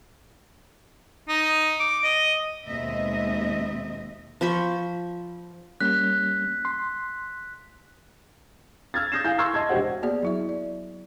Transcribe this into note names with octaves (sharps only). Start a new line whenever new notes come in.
D#4
D6
D#5
D#2 B2 G#3 C4 D#5 E5
F3 C5 B5 C#6
G3 A#3 C#4 F#6 B6
C6
E6 F6 G#6 A6
D#6 G6 A#6 C7 E7
E4 F5 G#5 G6
C6 C#6 E6 F6 G#6 C7
D#5 A5 G#6
E1 D4 F#4 G4 C5 F#5
A#3 B3 F#4 G#4 D5
F#3 E4 E5
D5